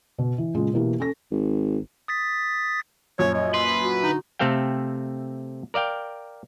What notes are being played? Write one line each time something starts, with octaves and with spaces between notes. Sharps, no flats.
B2
E3
A#2 C#3 G#3 F4
B2 E3 A#3 E4 G4
C#4 A4 A#6
G#1
D#6 A6 B6
F#2 A#2 F3 C#5
C#5 D#5
B4 C6
F#4
D3 D#4
C3 A3 C4 A4 F5 G5
A#4 D5 F5 G5